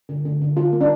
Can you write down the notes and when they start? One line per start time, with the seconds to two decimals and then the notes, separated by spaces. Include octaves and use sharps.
0.09 D3
0.25 D3
0.42 D3
0.57 D3 F4
0.73 A#3
0.81 D4